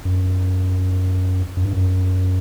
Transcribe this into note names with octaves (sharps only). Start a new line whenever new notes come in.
F#2
F#2
G2
F#2